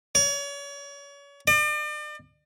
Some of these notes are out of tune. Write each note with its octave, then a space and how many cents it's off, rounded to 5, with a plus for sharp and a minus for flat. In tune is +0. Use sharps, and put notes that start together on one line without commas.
C#5 +35
D5 +40